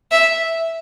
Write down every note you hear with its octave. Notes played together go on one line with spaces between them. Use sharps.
E5